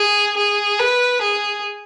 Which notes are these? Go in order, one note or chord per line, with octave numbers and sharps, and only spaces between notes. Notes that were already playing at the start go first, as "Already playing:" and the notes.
Already playing: G#4
G#4
B4
G#4